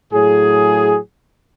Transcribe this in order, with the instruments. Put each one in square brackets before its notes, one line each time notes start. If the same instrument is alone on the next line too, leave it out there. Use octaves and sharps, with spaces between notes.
[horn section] A2 F#3 G#4